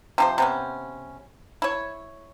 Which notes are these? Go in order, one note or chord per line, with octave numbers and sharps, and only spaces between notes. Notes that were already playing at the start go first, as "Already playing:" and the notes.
C3 F3 C5
C3 B3 C#4
E4 C#5